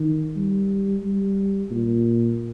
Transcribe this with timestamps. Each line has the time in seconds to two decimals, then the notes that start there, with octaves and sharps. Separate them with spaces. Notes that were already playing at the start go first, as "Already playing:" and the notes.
Already playing: D#3
0.36 G3
1.03 G3
1.71 A#2